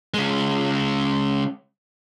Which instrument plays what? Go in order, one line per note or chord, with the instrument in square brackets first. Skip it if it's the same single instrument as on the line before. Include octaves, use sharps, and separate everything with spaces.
[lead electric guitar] C#3 G#3